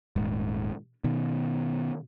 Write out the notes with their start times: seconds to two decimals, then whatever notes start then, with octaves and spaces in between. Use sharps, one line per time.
0.16 D#1 G#2
1.04 B2 D#3